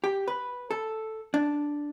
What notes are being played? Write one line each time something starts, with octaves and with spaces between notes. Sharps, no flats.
G4
B4
A4
D4